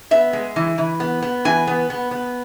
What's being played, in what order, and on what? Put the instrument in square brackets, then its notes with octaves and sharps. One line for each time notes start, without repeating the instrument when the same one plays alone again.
[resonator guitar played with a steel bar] B3 E5
G#3
E3
E3
B3
B3
E3 G#5
B3
B3
B3